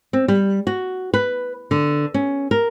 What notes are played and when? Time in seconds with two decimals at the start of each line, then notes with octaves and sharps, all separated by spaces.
0.13 C4
0.28 G3
0.67 F#4
1.14 B4
1.71 D3
2.14 C#4
2.51 A#4